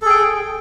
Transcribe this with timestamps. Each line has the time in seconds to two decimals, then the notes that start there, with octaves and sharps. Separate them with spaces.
0.02 A4
0.06 G#4
0.10 G5